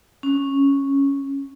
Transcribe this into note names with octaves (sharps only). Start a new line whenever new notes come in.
C#4